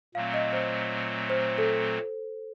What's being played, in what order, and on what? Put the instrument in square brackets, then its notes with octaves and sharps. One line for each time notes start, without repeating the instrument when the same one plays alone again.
[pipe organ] A#2 F#3 A3 C4 [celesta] F5
[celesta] D#5
C5
C5
A4